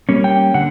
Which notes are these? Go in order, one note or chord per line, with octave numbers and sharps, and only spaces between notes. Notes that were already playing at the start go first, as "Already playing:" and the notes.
G3 A#3 C#4
G5
D3 F#5